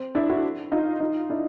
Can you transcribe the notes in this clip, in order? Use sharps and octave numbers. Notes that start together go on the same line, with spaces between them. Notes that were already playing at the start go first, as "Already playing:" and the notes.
Already playing: C4
D4 E4
E4 F#4
D#4 F4
D#4 F4
D4 E4